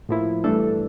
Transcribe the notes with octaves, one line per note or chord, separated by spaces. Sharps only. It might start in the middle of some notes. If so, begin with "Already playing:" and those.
A2 F3 A#3 E4
G2 E3 A3 D4 A4